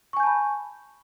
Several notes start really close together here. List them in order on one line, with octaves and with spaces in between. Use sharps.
C#6 G#5 G6 A5 B5